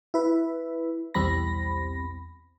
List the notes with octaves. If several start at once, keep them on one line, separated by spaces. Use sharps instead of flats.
E4 B4
B1 E2 G3 C4 B5 A#6